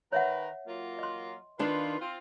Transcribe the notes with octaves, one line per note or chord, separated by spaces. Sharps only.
D#3 A#4 B4 C#5 E5 F#5
F#3 A#3 F4
D#5 C6
D#3 D4 F4 B4
C4 F4